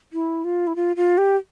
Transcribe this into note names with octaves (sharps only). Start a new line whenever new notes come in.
E4
F4
E4
F4
F4
G4